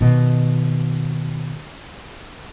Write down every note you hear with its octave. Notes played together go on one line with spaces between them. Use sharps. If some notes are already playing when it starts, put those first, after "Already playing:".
B2 D#3